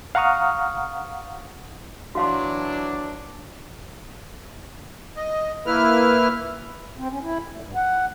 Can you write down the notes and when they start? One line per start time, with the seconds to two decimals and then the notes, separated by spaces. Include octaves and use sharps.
0.15 F5 F#5 A#5 C#6 D#6 F6
2.15 E3 F#3 D4 F#4 F5 C6
5.17 D#5
5.66 A#3 E4 B4 F6
6.98 C4
7.11 C#4
7.22 E4
7.48 D2
7.61 G2
7.75 F#5